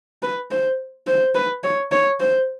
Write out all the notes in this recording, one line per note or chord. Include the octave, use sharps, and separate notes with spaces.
B4
C5
C5
B4
C#5
C#5
C5